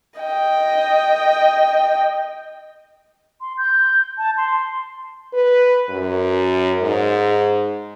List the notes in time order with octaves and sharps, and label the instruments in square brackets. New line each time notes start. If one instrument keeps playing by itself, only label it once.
[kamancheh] D#5 G5
[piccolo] C6
G6
A5
C6
[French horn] B4
F#2
G#2